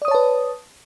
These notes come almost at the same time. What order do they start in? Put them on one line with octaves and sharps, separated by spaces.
D5 D#6 C#5 A5 B4